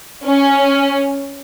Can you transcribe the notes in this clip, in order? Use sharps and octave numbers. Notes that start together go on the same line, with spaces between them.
C#4